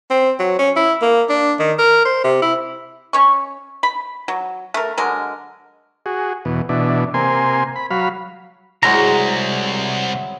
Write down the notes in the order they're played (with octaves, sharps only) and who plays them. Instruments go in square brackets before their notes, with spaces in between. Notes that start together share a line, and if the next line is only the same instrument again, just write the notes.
[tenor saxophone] C4
F#3
C#4
E4
A#3
D4
D#3
A#4
C5
C3
E4
[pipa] C#4 C#5 C#6
B5
F#3
A3 A#4
D3 F#3 G#3 A#4
[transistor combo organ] F#4 G#4
E2 B2
B2 E3 D4
C3 A#3 G#5 C6
B5
F#3 F5 B5
[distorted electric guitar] C2 [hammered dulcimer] F#3 G#3 E4 [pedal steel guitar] A#5